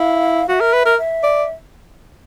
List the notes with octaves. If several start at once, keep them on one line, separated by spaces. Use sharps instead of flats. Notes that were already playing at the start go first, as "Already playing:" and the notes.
Already playing: E4 F5
F#4 E5 F5
A#4
B4
A#4
E5
D5